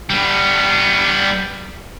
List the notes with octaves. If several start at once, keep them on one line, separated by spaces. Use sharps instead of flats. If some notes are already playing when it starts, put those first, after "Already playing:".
G3 B3